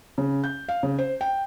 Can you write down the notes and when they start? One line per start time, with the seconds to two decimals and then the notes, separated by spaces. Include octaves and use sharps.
0.18 C#3
0.44 G6
0.69 F5
0.83 C#3
0.99 C5
1.21 G5